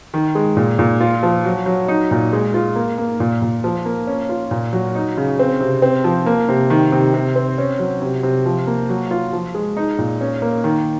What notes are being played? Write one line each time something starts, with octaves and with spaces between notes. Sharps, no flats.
D#3
G#3
A#2
A#2
F4
F3
F#3
F#3
D#4
A#2
G#3
F4
A#3
A#3
A#2
A#2
F3
A#3
C#4
F4
A#2
F#3
D#4
C#3
C4
C3
C4
F3
A#3
C3
D#3
C3
C3
C4
C#4
F#3
C3
C3
F3
A#3
F#3
F4
F3
G#3
D#4
A#2
C#4
A#3
D#3